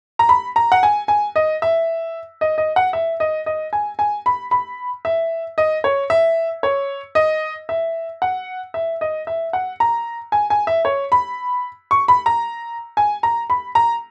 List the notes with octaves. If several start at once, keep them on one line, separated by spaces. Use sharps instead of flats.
A#5
B5
A#5
F#5
G#5
G#5
D#5
E5
D#5
D#5
F#5
E5
D#5
D#5
G#5
G#5
B5
B5
E5
D#5
C#5
E5
C#5
D#5
E5
F#5
E5
D#5
E5
F#5
A#5
G#5
G#5
E5
C#5
B5
C#6
B5
A#5
G#5
A#5
B5
A#5